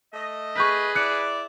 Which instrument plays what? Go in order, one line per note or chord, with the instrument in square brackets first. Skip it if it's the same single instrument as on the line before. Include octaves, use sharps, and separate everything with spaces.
[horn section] A3 D#5
[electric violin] G#4 B4 [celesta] C#6 G6 B6
[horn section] E4 D5 [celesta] F#6 C#7